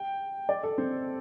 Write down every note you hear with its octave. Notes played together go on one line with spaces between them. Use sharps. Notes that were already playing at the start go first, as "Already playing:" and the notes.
Already playing: G5
D5
A4
C4